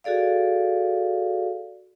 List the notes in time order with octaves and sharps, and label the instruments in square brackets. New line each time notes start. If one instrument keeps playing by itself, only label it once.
[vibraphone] F#4 G#4 A4 D5 F5